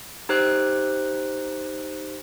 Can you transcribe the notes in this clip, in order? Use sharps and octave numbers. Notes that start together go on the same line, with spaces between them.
D#4 G4 C5 F#6